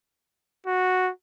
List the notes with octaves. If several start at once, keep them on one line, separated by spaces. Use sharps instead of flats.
F#4